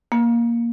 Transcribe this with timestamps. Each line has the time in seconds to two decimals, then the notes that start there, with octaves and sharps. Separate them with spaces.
0.12 A#3